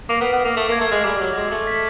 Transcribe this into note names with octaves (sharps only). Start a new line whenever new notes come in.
A#3 D6
B3
F6
B3
A#3 F6
A3 D6
A#3
G#6
A3
G#3 D6
G3 D6
F#3 D6
G#3 D6
A3 F#7
B6